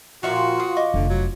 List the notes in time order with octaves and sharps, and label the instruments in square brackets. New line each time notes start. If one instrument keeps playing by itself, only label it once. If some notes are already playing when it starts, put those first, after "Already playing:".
[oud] A#2 F3 [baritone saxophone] F#4 [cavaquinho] D5 E5 C#6
[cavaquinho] G4
[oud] F4 [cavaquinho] D#6
[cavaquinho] D#5 C#6 D6
[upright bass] F1 [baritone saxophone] D3
[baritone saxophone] F#3